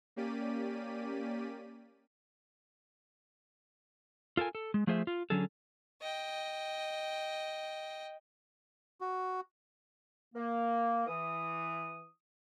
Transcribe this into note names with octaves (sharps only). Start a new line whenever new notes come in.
A#3 C#4 G4 D5 B6 D#7
F4 A4 A#4 G#5
A4
G#3
F3 A3 F4 G#4 C5 E5
F4
D3 F#3 C#4 G#4 A4
D#5 G5
F#4
A#3
E3 D#6